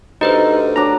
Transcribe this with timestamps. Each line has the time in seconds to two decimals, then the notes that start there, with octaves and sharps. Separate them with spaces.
0.21 D2 D#4 G4 B4 C5
0.76 F#3 D4 A#5